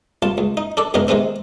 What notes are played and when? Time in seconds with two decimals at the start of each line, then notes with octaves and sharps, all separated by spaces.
0.22 C2 F4 A5
0.38 C#2
0.57 D#4
0.77 D4 A4 D5
0.94 C#2 F#2 B2 C#4 D#4 A#4
1.08 C3 D#3 G#3 B3 C4